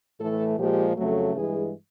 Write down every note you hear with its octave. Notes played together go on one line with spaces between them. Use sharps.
A2 E3 A3 A4
A#2 F3 G#3 G4
F2 C#3 F#3 A3
G2 E3 G#3 G#4